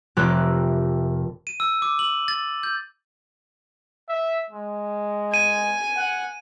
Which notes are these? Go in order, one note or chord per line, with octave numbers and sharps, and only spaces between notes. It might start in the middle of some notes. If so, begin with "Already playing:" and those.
F1 G4 A#4 E5 D6 F#6
D#7
E6
D6
F#7
A6
G6
E5
G#3
G#5 D#7
F#5